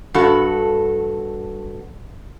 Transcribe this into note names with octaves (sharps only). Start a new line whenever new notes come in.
G2 F#4 A4